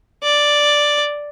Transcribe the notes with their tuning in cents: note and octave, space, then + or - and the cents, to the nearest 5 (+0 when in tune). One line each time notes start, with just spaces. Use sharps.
D5 +0